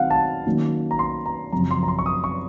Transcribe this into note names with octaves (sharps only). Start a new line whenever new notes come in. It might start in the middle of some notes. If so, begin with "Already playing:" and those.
Already playing: D#3 F#3 C4 F5 F#5
A5
D#3 F#3 A#3 C#4
A#5
C6
A#5
F#2 C#3 F3 C4 A#5
C6
A#5
C6
C#6
D#6
C#6